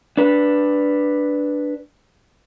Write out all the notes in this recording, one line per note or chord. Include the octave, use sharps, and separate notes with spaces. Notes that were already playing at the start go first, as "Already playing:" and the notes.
D4 B4